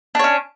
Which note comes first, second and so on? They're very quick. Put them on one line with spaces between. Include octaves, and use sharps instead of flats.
D4 C#5 C#4